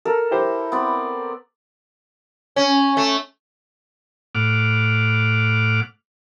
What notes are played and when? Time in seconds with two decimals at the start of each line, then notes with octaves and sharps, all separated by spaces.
0.05 A4 A#4
0.32 E4 G4 C5
0.72 B3 C4 D5
2.56 C#4
2.97 A3
4.35 A2 F#5 D6 F6